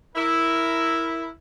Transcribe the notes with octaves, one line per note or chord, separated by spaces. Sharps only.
E4 A#4